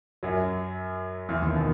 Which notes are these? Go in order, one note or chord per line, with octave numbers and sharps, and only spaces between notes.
F#2 F#3
E2 E3
D#2 D#3
B2